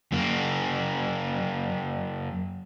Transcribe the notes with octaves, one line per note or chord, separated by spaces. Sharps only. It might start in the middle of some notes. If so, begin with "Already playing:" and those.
F#2 A#3